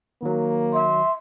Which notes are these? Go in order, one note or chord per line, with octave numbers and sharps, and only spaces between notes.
D#3 F#3 A#3
E5 C6